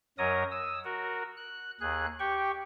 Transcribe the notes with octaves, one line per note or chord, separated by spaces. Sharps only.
F#2 F#3 A#4 C#5 D#5 D#6
D#6 E6
F#4 A#4
F#6
D#2 G#4 F#6
G4 G5 C#6